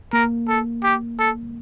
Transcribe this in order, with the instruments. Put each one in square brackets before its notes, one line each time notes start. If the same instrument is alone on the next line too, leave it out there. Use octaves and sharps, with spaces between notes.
[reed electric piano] A#3 [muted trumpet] A#4
[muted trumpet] A4
G4
A4